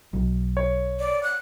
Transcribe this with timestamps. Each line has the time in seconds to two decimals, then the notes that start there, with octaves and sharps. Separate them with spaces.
0.13 B1 F#3
0.57 C#5
0.99 D5
1.23 F#6